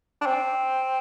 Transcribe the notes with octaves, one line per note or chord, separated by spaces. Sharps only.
D4
C4